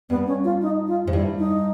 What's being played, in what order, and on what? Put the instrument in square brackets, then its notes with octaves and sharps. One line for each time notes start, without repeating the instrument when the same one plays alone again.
[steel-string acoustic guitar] G2 [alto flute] B3
[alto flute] C#4
F4
D#4
F4
[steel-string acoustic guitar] G#2
[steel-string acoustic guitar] G2 [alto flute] E4
[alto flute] D#4